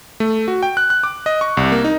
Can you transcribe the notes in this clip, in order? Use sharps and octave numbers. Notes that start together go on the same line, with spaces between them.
A3
F#4
G5
F#6
F#6
D6
D#5
C#6
C2
A#3
D#4